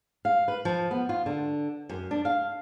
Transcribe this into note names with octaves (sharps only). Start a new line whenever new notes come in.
F5
B4
F3
B3
F4
D3
F#2
D4
F5